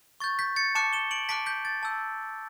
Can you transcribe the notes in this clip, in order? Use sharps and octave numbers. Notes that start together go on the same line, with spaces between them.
C#6 G6 A6
G6 B6
A6 C#7
A5 D6 F#6 C#7 E7
E7 G7
D7 F#7
A5 D6 F#6 B6 D7
G6 B6
A6
A5 E6 G6